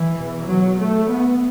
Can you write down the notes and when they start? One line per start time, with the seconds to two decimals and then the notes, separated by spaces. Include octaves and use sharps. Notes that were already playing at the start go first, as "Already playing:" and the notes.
Already playing: E3
0.14 E2 B2
0.46 F#3
0.78 A3
1.08 B3